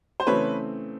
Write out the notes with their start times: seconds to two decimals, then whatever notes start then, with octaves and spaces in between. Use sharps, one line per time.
0.20 C5
0.27 C#3 E3 A3 C4 B4 C#5